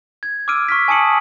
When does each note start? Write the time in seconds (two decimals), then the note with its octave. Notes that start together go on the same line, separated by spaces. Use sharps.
0.23 G#6
0.48 D6 E6 F6 D7 D#7
0.69 C#6 F6 B6
0.88 G#5 A5 D#6 C#7 F#7